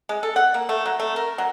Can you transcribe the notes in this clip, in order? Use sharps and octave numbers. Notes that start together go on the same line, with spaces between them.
G#3
A4
F#5
A#3
A3
F#3
A3
A#4
F#3